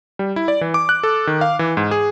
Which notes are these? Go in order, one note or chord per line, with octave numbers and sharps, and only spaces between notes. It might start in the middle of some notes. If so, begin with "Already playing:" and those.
G3
E4
D5
E3
D6
F#6
A4
D#3
F5
E3
G#2
G#4